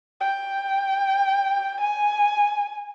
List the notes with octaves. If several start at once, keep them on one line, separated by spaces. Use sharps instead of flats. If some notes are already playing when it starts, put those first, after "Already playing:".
G5
G#5